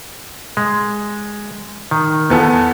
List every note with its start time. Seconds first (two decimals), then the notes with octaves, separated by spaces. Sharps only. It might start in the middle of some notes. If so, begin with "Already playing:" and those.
0.57 G#3
1.91 D#3
2.30 E2 B3 A4